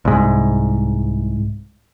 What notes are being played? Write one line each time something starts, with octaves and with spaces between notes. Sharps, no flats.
C2 G#2